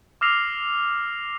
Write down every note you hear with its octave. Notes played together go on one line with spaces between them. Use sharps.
D6 E6 F6 A#6 C7 F7